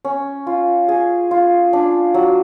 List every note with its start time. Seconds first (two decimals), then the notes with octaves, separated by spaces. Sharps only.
0.05 C#4
0.47 F4
0.88 G#4
1.31 F4
1.73 D4
2.14 F#3